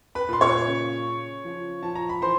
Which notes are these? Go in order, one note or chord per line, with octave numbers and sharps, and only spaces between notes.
B4 B5
A#2 C6
C#5 C#6
C#3
C#3
F3
F3 A5
A#5
B5
E3 C5 C6